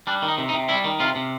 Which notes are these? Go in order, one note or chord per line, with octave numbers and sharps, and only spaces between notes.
G3 D4
D#3
D#4
C3
D#4
C3
G3 E4
D#3
C3 F4
C3